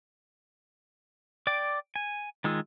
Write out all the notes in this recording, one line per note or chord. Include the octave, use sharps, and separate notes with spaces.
D5 G5 D6
G#5
D#3 G#3 F4 E6